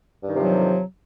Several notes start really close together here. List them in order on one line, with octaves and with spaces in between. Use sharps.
G2 D#3 C3 F3 F#3